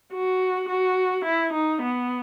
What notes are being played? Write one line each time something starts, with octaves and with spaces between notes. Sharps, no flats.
F#4
F#4
E4
D#4
B3